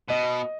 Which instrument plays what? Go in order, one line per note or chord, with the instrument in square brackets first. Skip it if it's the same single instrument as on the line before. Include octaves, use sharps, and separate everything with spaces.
[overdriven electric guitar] B2 [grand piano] D#5